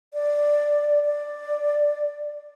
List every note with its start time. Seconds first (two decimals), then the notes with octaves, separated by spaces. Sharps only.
0.14 D5
1.05 D5